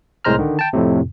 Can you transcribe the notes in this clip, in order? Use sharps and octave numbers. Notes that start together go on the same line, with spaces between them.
C2 A2 G#3 C5 A#5 F6
D3 D#3
G5 A5
F2 A2 C3